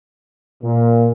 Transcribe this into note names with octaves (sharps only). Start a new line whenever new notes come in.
A#2